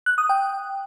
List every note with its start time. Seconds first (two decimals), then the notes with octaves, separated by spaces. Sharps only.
0.06 F#6
0.18 D#6
0.29 G5